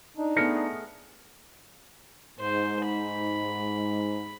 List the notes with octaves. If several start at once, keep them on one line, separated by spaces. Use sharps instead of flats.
D4 D#4
A3 B3 G#4 F6 A#6 C#7
G#2 C5
B5